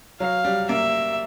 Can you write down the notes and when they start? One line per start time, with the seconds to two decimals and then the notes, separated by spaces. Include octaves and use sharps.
0.20 F#3 F5
0.45 G3
0.69 A#3 E5